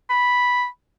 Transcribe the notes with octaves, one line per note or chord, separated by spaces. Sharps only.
B5